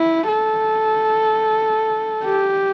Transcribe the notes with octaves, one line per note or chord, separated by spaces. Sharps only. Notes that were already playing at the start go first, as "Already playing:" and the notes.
Already playing: E4
A4
G4